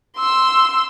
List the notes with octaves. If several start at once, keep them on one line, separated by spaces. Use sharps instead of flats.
C6 E6